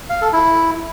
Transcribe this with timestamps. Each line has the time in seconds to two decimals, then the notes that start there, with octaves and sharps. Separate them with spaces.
0.10 F5
0.21 A4
0.33 E4